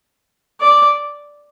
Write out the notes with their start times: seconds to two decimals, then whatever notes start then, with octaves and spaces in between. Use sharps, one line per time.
0.61 D5